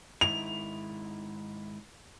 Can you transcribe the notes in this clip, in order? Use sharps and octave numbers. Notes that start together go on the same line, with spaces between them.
G#2 D#3 E4 F7